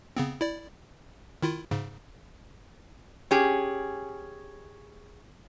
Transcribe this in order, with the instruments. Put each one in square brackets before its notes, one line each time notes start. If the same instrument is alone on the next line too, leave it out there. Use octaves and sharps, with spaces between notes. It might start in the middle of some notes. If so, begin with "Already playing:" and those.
[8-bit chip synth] C#3 B3 C4
E4 D5
D#3 E4 F4
G#2 C#3
[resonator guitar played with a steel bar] C#4 G4 G#4